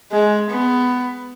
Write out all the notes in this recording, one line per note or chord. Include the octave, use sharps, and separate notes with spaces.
G#3
B3